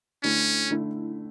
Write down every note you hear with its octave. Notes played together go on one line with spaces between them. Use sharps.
D3 A3 C#4 E4
D3 A3 E4